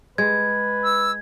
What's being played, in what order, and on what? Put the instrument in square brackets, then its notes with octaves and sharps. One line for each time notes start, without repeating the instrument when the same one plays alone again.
[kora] G#3 [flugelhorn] B4 [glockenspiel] G#6
[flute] E6